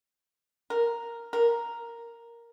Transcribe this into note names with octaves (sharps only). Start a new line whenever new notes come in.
A#4
A#4